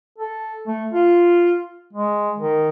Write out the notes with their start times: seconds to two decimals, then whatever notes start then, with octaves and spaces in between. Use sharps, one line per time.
0.18 A4
0.67 A3
0.92 F4
1.93 G#3
2.38 D#3